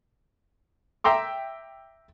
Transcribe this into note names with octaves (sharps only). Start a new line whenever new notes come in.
E5 G5 A#5 C6 D6